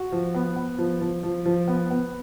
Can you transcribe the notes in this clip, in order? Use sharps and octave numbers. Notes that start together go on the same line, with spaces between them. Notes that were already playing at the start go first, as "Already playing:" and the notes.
Already playing: F#4
F3
B3
B3
F3
F3
F3
F3
B3
B3